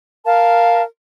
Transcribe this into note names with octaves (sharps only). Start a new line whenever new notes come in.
A#4 F5 A5